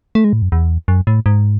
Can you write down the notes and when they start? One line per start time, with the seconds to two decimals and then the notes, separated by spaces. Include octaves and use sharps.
0.15 A3
0.24 G#3
0.33 A2
0.42 F#2
0.52 E2
0.88 F#2
1.07 A2
1.26 G#2